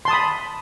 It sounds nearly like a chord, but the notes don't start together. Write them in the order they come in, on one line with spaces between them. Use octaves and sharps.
C6 A5 D#6 B5